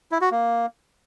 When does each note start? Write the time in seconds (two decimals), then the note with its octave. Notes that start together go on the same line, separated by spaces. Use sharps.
0.12 E4
0.21 F#4
0.31 A#3